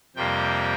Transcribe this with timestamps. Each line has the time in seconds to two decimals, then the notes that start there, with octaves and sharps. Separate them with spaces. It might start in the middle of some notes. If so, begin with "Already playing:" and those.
0.16 F2 C3 G3 A#3 G5